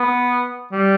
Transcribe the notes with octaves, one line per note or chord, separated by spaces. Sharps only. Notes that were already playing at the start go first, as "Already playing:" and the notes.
Already playing: B3
G3